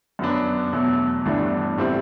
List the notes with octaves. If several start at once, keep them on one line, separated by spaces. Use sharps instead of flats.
F#2 F#3 B3 D4
E2 B2 F#3 A3
G1 G2 E3 A3 D4
A2 G3 C4 E4